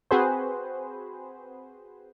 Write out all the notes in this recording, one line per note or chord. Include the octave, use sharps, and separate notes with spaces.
C4 F#4 G#4 B4 C5